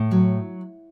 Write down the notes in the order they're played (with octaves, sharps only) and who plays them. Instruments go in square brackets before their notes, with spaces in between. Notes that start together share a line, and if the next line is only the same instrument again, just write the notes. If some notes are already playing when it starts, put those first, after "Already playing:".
Already playing: [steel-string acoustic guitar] A2
F#3